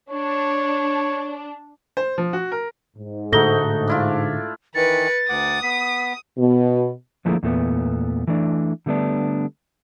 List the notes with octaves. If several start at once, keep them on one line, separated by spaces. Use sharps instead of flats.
D4 C#5
C5
F3
F#4
A#4
G#2
A2 D3 A3 D#4 F#4 A4 A#6 G7
D4 E4 F4
D#3 E3 B4 A6 C#7
D2 F#5 D6 D#6
B3 B6
B2
D3 F3 A3 A#3 E4 G#4
E2 A#2 A3 B3
E3 A3 D4
D3 G3 A3 B3 D4